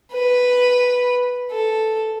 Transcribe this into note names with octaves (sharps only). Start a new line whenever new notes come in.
B4
A4